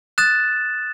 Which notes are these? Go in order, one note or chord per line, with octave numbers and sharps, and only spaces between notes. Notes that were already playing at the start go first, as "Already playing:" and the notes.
D#6 F#6 A6 E7